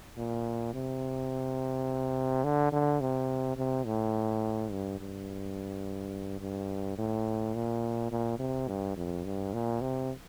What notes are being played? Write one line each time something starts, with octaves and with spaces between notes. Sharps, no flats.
A#2
C3
D3
D3
C3
C3
A2
G2
G2
G2
A2
A#2
A#2
C3
G2
F2
G2
A#2
C3